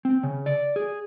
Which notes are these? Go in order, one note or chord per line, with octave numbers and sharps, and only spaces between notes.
C4
C#3
D5
G#4